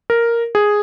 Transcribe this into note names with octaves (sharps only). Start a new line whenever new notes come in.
A#4
G#4